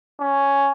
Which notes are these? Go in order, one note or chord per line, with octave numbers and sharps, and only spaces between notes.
C#4